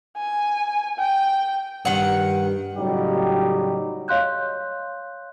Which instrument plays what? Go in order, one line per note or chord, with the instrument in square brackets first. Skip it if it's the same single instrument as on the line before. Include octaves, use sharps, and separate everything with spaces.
[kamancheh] G#5
G5
[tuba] G2 [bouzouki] D#3 F#5
[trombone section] A2 C#3 F#3 G3 D#4 G4
[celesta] C#5 D#5 F5 C6 F#6 G6